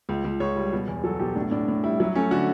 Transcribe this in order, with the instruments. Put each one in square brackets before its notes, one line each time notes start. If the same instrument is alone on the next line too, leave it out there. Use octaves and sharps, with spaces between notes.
[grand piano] C#2
C#2
C#2 C#5
G3
B2
E2
F#3 A4
B2 G4
A2 D4
A2 D4
A2
G3 E4
F#3 E4
A3 C#4
D3 F#4